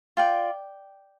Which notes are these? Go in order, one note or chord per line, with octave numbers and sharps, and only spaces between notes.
F4 D5 G5